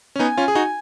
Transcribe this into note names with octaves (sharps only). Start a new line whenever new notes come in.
C#4
B3 D#4 G#5
C#4 F4
G#4
D#4 F#4